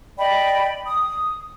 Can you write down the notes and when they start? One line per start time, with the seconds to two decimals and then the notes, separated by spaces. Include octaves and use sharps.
0.18 D5 D#5 G5 B5
0.86 D#6